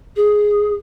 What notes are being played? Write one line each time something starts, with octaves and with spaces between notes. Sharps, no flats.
G#4